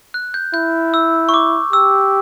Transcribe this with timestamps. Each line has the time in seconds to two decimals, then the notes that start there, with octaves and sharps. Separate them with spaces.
0.14 F#6
0.34 G6
0.54 E4 G6
0.94 E6
1.29 C#6
1.34 D6
1.73 G4 E6